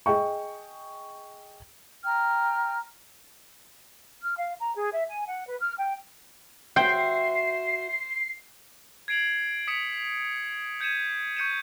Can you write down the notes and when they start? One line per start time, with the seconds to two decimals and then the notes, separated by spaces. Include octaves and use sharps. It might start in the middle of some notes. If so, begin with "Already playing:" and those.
0.06 G#4 D#5 G5 C#6
2.04 G5 A#5 F6
4.23 F6
4.38 F5
4.59 A#5
4.75 G#4
4.92 E5
5.08 G#5
5.26 F#5
5.48 B4
5.60 F6
5.77 G5
6.76 F#4 C5 E5 G5 C7
9.08 G#6 C7 D7 F7 F#7
9.68 D#6 B6 C#7 E7
10.80 G6 G#6 C#7 D#7 E7
11.37 C#6 G6 C#7 D#7 E7